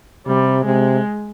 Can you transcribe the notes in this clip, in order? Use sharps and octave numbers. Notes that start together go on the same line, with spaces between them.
C3 G3
C3 G#3